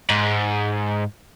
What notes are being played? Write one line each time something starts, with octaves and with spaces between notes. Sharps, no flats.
G#2